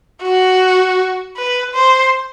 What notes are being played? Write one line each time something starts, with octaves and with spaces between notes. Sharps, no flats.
F#4
B4
C5